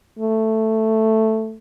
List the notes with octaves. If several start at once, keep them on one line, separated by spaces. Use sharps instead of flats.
A3